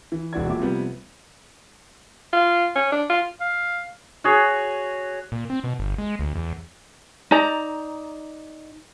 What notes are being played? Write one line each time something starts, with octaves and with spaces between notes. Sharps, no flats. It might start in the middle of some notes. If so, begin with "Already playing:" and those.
E3
E1 E3 F#4 D5 G#6
D#1 A#2 E5 D6
C3 F3 G3 B3
F4
C#4
D4
F4
F5
F#4 G#4 C#5
A#2
C4
B2
G1
G#3
D2
E2
D#4 D5 A#5